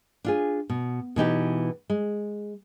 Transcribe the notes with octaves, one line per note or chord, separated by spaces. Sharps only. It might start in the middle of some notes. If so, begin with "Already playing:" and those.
D4 F4 G#4
B2
B2 E3 D#4 G4
G#3